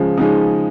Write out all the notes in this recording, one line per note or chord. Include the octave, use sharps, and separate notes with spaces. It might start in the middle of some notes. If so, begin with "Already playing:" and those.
Already playing: C#3 F3 G#3
C#3 F3 G#3 D#4